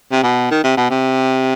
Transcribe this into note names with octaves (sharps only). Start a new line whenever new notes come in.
C3
B2
D#3
C3
B2
C3